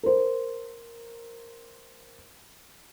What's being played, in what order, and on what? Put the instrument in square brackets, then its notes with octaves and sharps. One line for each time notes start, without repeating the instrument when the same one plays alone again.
[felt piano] A#4 C5